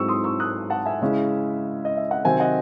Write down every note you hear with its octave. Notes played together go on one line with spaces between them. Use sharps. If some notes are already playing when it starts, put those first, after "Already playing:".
Already playing: G#2 F#3 C4 E4 G#4 C#6 E6
C6 D#6
C#6 E6
D#6 F#6
F#5 A5
E5 G#5
C#3 G#3 C#4 E4
D#5
E5
F#5
C3 D#3 F#3 C4 E5 G#5
D#5 F#5